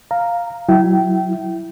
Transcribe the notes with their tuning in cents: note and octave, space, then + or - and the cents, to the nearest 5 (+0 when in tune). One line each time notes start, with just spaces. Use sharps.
F5 +0 A#5 -5
F#3 +10 E4 +5 G5 -25